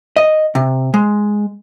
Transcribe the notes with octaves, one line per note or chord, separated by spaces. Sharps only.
D#5
C3
G#3